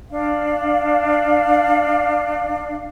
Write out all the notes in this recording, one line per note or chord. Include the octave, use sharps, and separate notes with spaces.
D4 F5